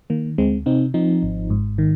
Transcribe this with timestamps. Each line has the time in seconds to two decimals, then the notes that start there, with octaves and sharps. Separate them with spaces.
0.10 D#3 A#3
0.38 D2 G#3 C4
0.66 C3 C4 D#4
0.94 F3 C4 D#4
1.23 G#1
1.50 G#2
1.78 D#3